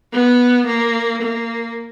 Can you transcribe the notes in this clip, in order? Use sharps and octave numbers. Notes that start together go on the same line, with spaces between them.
B3
A#3
A#3